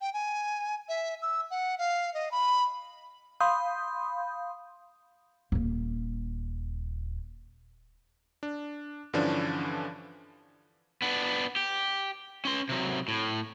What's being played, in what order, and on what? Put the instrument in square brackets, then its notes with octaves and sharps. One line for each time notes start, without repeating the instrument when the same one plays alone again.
[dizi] G5
G#5
E5
E6
F#5
F5
D#5
B5
[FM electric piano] F5 B5 C6 D#6 G6
[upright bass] D#1 A#3
[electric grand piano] D4
G2 D3 E3 F3 C#4 D4
[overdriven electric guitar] B3 D4
G4
C#4 C6
C3 F#3
A2